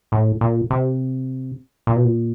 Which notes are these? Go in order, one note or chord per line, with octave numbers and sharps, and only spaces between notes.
A2
A#2
C3
A#2
B2
A#2